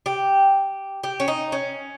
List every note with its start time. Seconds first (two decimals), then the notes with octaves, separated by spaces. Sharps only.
0.06 G4
1.03 G4
1.20 C#4
1.28 D#4
1.52 C#4